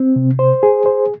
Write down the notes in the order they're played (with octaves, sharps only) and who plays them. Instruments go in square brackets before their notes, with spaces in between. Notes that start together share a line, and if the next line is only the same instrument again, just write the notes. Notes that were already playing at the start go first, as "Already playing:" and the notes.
Already playing: [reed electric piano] C4
C3
C5
G#4
C5